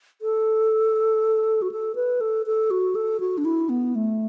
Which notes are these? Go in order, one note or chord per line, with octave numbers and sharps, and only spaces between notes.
A4
F#4
A4
B4
A4
A4
F#4
A4
F#4
D4
E4
B3
A3